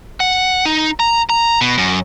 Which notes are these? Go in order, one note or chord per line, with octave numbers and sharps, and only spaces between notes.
F#5
D#4
A#5
A#5
B2
F#2